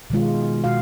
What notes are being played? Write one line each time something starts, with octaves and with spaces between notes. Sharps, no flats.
B2 D#3 G#3 F4
B2 F#4 F5